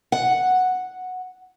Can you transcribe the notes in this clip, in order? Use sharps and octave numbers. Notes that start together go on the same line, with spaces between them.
F#5